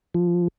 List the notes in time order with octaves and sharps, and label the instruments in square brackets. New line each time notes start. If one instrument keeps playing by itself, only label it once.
[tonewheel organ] F3